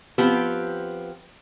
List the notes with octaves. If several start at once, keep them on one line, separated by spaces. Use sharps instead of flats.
F3 B3 C4 G4